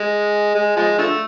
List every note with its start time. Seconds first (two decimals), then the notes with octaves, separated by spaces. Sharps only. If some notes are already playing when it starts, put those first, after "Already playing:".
Already playing: G#3
0.55 G#3
0.76 F3 G#3
0.98 D3 F3 A3